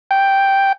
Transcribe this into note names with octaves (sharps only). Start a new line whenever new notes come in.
G5